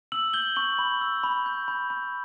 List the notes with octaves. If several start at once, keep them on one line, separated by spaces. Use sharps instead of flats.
E6 F#7
G6 G7
C#6 F#7
B5
E6
B5
G6
B5
B5